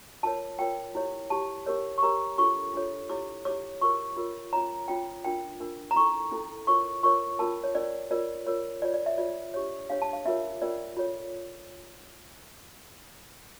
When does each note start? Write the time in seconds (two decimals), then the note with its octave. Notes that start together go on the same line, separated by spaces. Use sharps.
0.23 F4 A#4 C#5 A5
0.59 F4 A#4 C#5 G5
0.95 E4 G4 C#5
1.30 E4 G4 C#5 A5
1.67 C#4 G4 A#4 C#5
1.98 C#6
2.02 C#4 G4 A#4 C#5 A#5
2.38 D4 F4 A4 C#5 C#6
2.74 D4 F4 A4 C#5
3.10 E4 G4 C#5 D6
3.45 E4 G4 C#5 D6
3.81 F4 A#4 C#5 C#6
4.17 F4 A#4 C#5
4.53 C#4 F4 C#5 A#5
4.88 C#4 F4 C#5 G5
5.24 D4 F4 A#4 G5
5.60 D4 F4 A#4
5.91 A#5
5.96 C#4 E4 A4 C#6
6.32 C#4 E4 A4
6.67 F4 A#4 C#5 C#6
7.03 F4 A#4 C#5 C#6
7.39 C#4 F4 A#4 A5
7.63 C#5
7.75 C#4 F4 A#4 D5
8.11 F4 A#4 C#5 D5
8.47 F4 A#4 C#5
8.82 F4 C#5 D5
8.94 D5
9.06 E5
9.18 F4 C#5 D5
9.54 D4 G4 C#5
9.90 D4 G4 C#5 F5
10.02 A5
10.13 F5
10.25 C#4 F4 A#4 C#5 E5
10.62 C#4 F4 A#4 C#5 D5
10.97 F4 A4 C#5